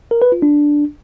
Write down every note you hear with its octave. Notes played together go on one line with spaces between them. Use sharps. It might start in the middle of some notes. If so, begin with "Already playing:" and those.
A#4
B4
F4
D4